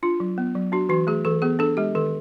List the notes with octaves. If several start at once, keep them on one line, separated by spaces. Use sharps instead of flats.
D4 F4
F#3
B3
F#3
D4 F#4
E3 F#4
A3 G#4
E3 A4
B3 G#4
D4 A4
G#3 G4
D#3 A4